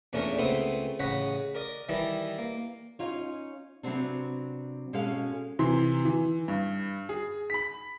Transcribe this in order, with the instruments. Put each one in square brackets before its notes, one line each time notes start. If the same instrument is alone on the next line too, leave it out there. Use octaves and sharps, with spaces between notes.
[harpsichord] E2 A#2 A3 C#4 D4 A#4
C#2 A3 B3 C4 C6 D#6
A1 C#3 C#5 D#5 F#5 B5
A#4 D5 D#5
D#3 E3 G3 E4 D5 D#5
A#3
[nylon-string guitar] C#4 D#4 F4 C#5
C3 F#3 G#3 B3 C4 D4
B2 G#3 C#4 A4 F5
[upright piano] C3 E3 C6
E3
G2
G#4
B5 B6